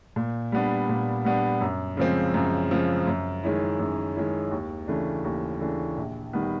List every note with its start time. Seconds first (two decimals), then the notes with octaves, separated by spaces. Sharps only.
0.16 A#2
0.52 G3 B3 D4
0.89 A#2
1.25 G3 B3 D4
1.61 F#2
1.97 C#3 F3 G#3 C4
2.34 F#2
2.71 C#3 F3 G#3 C4
3.07 F#2
3.44 D#3 G#3 C#4 E4
3.79 F#2
4.15 D#3 G#3 C#4 E4
4.51 D#2
4.88 C#3 E3 A3 D4
5.25 D#2
5.61 C#3 E3 A3 D4
5.98 A#1
6.33 D#3 G3 B3